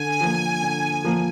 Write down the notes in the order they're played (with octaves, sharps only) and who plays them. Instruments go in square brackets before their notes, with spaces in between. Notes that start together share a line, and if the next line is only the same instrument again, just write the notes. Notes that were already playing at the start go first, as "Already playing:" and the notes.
Already playing: [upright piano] D3 [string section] G#5
[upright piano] F3 A#3
D3
F3 A#3